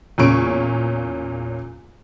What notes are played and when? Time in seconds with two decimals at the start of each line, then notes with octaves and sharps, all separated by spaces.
0.18 E2 A#2 C#3 C#4 C#6 D7